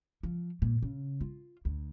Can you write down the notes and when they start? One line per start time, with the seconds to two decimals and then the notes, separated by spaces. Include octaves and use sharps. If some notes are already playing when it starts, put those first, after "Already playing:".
0.23 F3
0.62 A#2
0.82 C#3
1.21 F4
1.65 D2